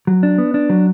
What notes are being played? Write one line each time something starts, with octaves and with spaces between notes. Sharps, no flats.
F#3
D4
B3
D4
F#3